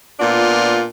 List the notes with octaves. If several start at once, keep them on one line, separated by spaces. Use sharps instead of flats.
A#2 B3 D4 F4